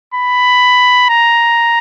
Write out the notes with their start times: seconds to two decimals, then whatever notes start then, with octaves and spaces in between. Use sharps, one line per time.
0.14 B5
1.09 A#5